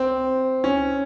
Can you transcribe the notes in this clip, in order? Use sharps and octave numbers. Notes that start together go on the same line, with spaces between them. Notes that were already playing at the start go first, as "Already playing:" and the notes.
Already playing: C4
C#4